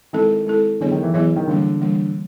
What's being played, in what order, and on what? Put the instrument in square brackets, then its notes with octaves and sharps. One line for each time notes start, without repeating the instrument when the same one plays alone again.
[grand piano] D#3 [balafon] G#3 C4 E4 A4
[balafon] G#3 C4 E4 A4
[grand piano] D3 [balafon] F#3 B3 E4 G#4 C#5
[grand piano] D#3
E3
[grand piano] E3 [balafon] F#3 B3 E4 G#4 C#5
[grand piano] D#3
[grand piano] D3 [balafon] E3 G3 A#3
[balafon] E3 G3 A#3